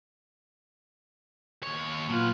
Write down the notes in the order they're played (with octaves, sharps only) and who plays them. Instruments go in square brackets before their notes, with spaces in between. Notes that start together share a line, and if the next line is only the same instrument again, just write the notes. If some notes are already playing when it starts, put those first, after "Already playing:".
[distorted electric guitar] D#2 C#5
[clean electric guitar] A#2 [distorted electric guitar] F#3 B4 [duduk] F4